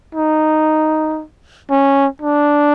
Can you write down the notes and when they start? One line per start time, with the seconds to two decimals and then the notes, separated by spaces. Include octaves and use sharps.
0.15 D#4
1.71 C#4
2.22 D4